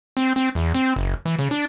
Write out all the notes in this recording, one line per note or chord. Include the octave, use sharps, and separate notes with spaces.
C4
C4
E2
C4
F#1
E3
C#3
D4